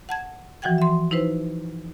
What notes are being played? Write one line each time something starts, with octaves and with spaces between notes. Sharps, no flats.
F#5 A5 G#6
E3 F3 F#4 F#5 G5 G#6
E5 C6
D#4 E4 B4 C5